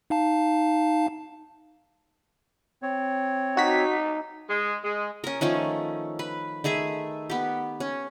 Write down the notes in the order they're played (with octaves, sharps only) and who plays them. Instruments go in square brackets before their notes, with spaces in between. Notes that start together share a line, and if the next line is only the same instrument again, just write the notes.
[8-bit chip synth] D#4 F5 A5
[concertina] C4 C#5
[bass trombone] D#4 [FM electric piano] F#4 B6
[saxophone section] G#3
G#3
[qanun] C#4 A#4
D#3 F3 A3 C#4
B4
D#3 A3 G#4 E5
B3 G4
C#4